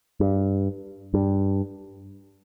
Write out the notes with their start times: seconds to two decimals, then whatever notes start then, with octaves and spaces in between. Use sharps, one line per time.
0.20 G2
1.14 G2